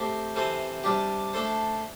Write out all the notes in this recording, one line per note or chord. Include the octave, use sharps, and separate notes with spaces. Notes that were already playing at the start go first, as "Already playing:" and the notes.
Already playing: A3 C4 G4 C5
C3 E3 C4 A4 C5
C3 G3 D4 G4
A3 D4 A4 C5